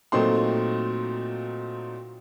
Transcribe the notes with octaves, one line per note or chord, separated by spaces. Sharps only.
A#2 F#3 A3 C4 D#4 C6